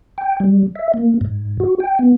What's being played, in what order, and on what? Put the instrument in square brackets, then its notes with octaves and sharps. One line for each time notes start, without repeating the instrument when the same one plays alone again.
[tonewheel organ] G5
G3
E5
A#3
G#2
F#4
G5
B3